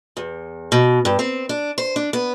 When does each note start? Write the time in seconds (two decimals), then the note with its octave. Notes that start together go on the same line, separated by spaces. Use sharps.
0.17 E2
0.72 B2
1.05 G2
1.19 C4
1.49 D4
1.78 C5
1.96 D4
2.13 B3